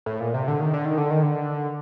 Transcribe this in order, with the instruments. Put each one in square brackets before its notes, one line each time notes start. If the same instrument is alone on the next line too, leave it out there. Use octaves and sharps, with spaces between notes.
[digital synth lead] A2
A#2
C3
D3
D#3
D3
D#3
D3
D#3
D3